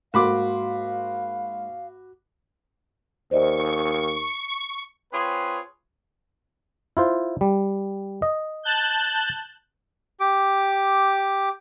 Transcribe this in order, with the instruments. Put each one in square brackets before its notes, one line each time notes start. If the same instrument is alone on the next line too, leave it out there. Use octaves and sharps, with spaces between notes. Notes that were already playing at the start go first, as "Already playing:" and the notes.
[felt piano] G#2 A#3 C6 [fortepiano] F#4 B5 D6 [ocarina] F5
[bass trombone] D#2 [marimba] C5 D5 D#5 [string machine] C#6
[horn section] C4 F4 G#4 B4 C#5
[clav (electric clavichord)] E4 F4 C5
G3
D#5
[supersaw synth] A5 F#6 G6
[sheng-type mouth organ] G4 D6